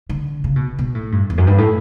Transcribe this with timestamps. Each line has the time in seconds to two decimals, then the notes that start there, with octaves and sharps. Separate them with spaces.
0.09 D3
0.44 C#3
0.56 B2
0.79 B2
0.95 A2
1.12 G2
1.30 E2
1.38 F#2
1.47 G2
1.58 A2